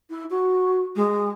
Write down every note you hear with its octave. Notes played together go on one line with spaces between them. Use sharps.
E4
F#4
G#3